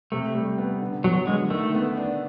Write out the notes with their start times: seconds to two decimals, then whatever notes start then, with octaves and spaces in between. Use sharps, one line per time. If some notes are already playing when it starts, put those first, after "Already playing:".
0.12 C3 A3
0.35 G3
0.58 B3
0.82 D3
1.04 F#3 B3
1.27 D3 G#3
1.50 D#3 A3
1.75 B3
1.97 D4